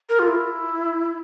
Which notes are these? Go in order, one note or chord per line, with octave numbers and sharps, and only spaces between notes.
A#4
F4
E4